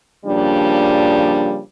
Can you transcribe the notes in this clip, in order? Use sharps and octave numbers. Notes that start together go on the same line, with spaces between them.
C#3 F3 G3 A#3 D4